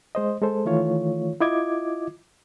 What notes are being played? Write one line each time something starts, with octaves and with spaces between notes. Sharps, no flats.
G#3 C5 D#5
G#3 A4 C5
D#3 E3 A3 F4 C#5
E4 F4 D#5 D6 G#6